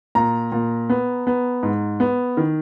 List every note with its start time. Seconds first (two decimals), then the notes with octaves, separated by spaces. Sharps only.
0.15 A#2 A#5
0.52 A#2
0.90 B3
1.27 B3
1.63 G#2
2.00 B3
2.37 D#3